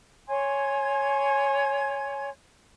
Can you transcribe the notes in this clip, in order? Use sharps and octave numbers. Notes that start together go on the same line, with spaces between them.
C#5 G#5 C6 G#6